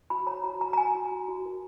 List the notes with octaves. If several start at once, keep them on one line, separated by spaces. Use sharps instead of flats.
F#4 B5
C#5 A#5
F#4 A#5
F#4 A#5
A#5
F#4 G#5
F#4
F#4
F#4
A#4